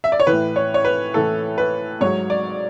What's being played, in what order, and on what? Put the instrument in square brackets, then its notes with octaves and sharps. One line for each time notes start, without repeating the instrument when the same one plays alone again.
[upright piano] E5
D5
C#5
A2 E3 B4
C#5
C#5
B4
A2 E3 A4
B4
G#2 F#3 C#5
D5